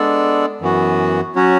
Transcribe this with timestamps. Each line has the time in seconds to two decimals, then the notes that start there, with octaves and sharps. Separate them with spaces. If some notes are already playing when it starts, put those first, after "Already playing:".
Already playing: G#3 B3 D4 A4 D5
0.61 F#2 E3 B3 F#4
1.35 F#3 C#4 F#4